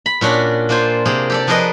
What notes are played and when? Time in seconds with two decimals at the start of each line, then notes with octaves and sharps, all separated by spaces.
0.06 B5
0.21 A#2 C#4 D4 F#4 B5
0.69 A#3 D4 F4 C5 G#5
1.05 C3 A#3 G#4
1.30 G4 A4 D5
1.47 F3 D4 G#4 A#4 B4 D#5